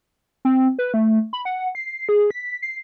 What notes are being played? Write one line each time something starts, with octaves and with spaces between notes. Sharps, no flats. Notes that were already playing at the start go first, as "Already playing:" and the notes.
C4
B4
A3
B5
F#5
C7
G#4
B6
C7